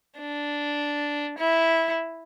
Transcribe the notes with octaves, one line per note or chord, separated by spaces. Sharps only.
D4
E4